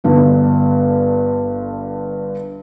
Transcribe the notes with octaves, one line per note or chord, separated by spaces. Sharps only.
G1 G2 D3